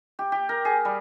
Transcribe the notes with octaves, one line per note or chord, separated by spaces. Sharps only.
G4
G4
A#4
G#4
G3